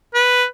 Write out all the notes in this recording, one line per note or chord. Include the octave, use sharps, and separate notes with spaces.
B4